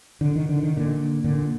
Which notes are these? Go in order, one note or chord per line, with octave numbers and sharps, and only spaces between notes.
D3
D#3
D3
D#3
A#2 D3
A#2 D3